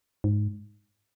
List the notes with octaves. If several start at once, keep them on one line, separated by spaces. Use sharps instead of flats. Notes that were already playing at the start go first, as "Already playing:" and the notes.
G#2